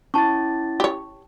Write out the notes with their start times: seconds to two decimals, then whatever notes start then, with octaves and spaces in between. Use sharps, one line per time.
0.14 C#4 E4 A5 C#6 A6
0.80 G4 C#5